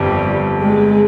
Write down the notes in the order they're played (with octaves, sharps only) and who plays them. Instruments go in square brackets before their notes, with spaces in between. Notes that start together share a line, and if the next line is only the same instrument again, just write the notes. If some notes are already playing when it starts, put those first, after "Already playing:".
Already playing: [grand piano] G1 F2 [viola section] G3
[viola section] G#3